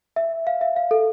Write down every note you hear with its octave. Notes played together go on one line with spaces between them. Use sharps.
E5
F5
E5
F5
A4